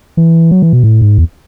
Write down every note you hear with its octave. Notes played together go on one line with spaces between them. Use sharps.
E3
F#3
E3
B2
A2
G#2
E2